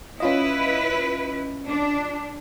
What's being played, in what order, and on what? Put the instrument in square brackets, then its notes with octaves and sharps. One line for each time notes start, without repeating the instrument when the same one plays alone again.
[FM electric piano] C#4 F4 D#5 [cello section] E4 B4
[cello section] D4